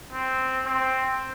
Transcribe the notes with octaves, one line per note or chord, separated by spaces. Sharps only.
C4
C4